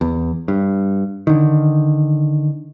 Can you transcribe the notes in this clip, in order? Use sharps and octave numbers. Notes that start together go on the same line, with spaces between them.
E2
G2
D3 D#3